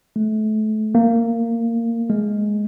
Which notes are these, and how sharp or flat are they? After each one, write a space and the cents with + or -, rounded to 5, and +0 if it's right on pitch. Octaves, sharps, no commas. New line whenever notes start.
A3 -30
A#3 -15
G#3 +5